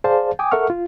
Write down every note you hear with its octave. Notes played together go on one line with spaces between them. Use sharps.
G#4 C5 D5 F5 A5
G5 G#5 D6 D#6
A4 A#4 E5 F#5 C#6 F6
F4